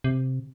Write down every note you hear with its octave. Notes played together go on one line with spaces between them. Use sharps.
C3